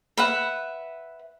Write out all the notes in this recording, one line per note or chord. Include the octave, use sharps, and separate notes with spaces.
B4 E5 F#5